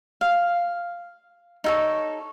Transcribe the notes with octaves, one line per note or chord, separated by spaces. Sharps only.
F5
D#4 A4 C#5